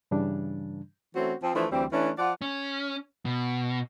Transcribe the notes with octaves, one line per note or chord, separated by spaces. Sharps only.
G2 C#3 E3 G3 D4
E3 A3 C4 C#4 F#4
F3 C4
E3 F3 A3 D4 E4
D2 E3 G3 C4
E3 A3 C#4 D4 E4
F3 F4 D5 F#5
C#4
B2